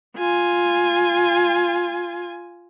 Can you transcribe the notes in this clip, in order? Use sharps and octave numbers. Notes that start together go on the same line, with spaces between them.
F4 G#5